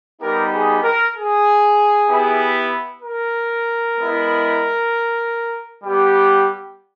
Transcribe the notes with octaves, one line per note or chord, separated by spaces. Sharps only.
G3 B3 D#4 G4 A#4
G#4
A#4
G#4
B3 E4 G4
A#4
G#3 B3 E4
G3 B3 G4